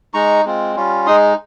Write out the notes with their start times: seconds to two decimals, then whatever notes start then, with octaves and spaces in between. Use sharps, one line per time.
0.14 G#3 D#4 A#5 C#6
0.45 G#3 C4 F4
0.76 G3 C#4 F4
1.07 G#3 D#4 C6 D#6